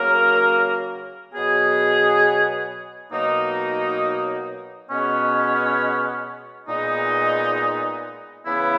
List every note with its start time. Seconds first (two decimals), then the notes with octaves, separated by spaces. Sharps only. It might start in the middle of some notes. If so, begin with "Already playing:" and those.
Already playing: C#3 F#3 A#3 A#4
1.34 B2 F#3 B3 G#4
3.11 B2 F#3 A#3 D#4
4.90 B2 G#3 B3 C#4
6.68 A#2 G#3 B3 D#4
8.46 C#3 E3 B3 E4